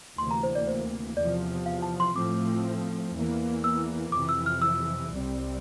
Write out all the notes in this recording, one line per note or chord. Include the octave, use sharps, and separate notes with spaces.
D2 C3 E3 A#3 C6
A#5
C5
D5
C5
E2 C3 F3 D5
F5
A5
C6
A2 F3 A3 C4 D6
E2 E3 A#3
E6
F2 C3 E3 D6
E6
F6
E6
C2 C3 G3 C4